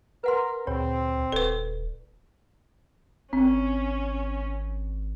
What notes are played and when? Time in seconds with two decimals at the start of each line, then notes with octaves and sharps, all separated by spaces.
0.24 A#4 B4 F#5 C6
0.67 D2 A#2 C4 C#5
1.32 D#1 A4 B4 D5
3.33 G#1 C4 C#4